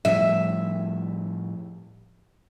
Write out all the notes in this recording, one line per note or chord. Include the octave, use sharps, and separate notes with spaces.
A2 F3 G3 E5